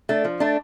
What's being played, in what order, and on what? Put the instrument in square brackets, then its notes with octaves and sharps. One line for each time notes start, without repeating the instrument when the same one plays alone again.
[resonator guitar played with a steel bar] A3 D4
F3
A3 D4